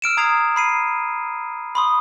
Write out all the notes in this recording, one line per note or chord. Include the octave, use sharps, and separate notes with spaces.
E6 F6 D7 E7
A#5 D#6 G#6 C7 F7
B5 C7 D#7
B5 C6 D#6